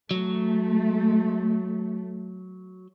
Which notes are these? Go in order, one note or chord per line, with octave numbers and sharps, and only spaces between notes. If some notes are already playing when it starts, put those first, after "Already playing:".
F#3 A3